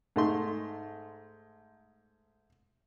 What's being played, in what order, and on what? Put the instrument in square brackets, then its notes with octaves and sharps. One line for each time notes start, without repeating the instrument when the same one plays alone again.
[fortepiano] G#2 A3 C6